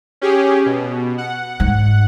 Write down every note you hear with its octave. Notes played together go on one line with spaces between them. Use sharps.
C#4 G4 G#4
B2
F#5
G#2